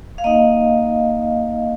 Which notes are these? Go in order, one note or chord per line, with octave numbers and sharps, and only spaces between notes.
F5
A#3 D#4 D#5